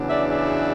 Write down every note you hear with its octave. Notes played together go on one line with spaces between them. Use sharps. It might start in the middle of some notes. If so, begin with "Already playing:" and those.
Already playing: E2 C#3 F#3 B3 D4
D5 E5
D5 E5